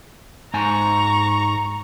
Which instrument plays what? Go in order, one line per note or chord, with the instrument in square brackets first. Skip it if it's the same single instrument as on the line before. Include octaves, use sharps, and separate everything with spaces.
[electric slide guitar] G#2 G#5 [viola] A#5 C#6